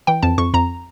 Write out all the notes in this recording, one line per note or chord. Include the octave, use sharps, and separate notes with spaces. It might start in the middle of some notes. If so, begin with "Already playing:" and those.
E3 G5
F2 A5
F2 C#6
F2 A#5